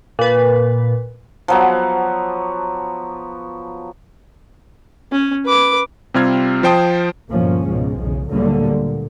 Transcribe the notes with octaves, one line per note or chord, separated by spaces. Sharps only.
A#2 B4
F3 F#3 B3
C#4
B4 D6
C3 G3 C4 F4 F6 G#6
F3 C5 G5 A5 D#6
D2 G2 A#2 F3 A#3 C#4
C#2 G#2 B2 F3 G#3
B1 E2 C#3
D2 A#2 D3 F#3 G3 A#3
A#2